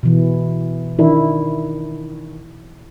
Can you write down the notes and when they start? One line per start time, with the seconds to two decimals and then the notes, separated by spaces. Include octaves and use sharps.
0.03 B2 E3
0.99 D#3 D4 E4